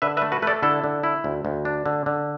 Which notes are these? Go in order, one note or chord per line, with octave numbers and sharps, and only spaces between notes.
D3 B4 E5
B4 E5
A3
F#4 B4
A3 A4 B4 D5
D3 E4 A4
D3
E4
D2
D2
D4
D3
D3